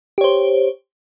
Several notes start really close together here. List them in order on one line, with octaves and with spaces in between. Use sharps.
G4 C#5 C5